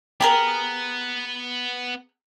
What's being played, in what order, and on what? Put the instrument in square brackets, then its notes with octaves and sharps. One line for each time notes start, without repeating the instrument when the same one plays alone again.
[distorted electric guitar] B3 [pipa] G4 G#4 A#4